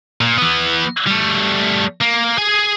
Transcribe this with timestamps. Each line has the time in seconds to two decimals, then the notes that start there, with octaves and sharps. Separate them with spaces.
0.21 A#2
0.38 E3 B3
1.07 G3 A3
2.01 A#3
2.38 G#4 G#5